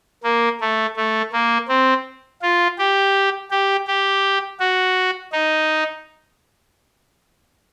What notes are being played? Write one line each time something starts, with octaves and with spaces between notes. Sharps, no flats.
A#3
A3
A3
A#3
C4
F4
G4
G4
G4
F#4
D#4